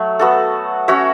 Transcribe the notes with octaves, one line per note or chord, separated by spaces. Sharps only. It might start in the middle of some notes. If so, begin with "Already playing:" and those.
Already playing: F#3 A3
B3 F#4 A4
C#4 F#4 C#5 E5